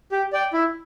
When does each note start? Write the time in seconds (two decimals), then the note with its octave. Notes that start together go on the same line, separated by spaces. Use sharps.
0.12 G4
0.33 D5 G5
0.53 E4